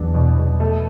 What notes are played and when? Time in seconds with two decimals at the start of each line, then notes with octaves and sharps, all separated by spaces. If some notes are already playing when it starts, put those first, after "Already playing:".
Already playing: E2 F#3 D4
0.14 B2
0.38 B2
0.60 A3